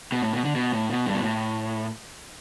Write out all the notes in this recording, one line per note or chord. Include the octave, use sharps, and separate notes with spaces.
B2
A2
B2
D3
B2
A2
B2
G2
B2
A2